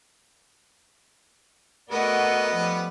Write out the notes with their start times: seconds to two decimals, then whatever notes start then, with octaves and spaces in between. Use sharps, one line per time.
1.90 A3 B3 F#4 A#4 D5 D#5
2.53 F3 G3